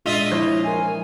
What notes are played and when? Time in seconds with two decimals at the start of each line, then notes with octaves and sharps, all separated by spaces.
0.06 A#2 G#3 D4 F4 D#5 E5
0.31 F3 E4 C5 C#5
0.64 E4 A#4 G#5